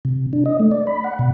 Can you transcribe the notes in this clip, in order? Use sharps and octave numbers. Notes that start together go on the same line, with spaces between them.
C3
D4
D#5
A3
D5
B5
F#5
B2